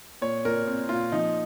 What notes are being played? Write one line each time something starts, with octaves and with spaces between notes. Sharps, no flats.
A#2 C#5
A#2 A#4
C4
A#2 F4
F3 D#4